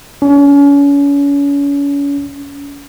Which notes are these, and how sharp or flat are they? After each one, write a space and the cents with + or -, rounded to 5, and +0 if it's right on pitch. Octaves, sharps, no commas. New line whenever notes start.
C#4 +35